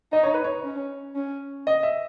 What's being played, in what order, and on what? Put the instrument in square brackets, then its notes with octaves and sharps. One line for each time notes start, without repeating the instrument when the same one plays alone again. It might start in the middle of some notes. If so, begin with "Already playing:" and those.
[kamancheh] D#4 [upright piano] D#5
[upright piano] C#5
B4
C#5
[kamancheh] C#4
C#4
[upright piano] D#5
E5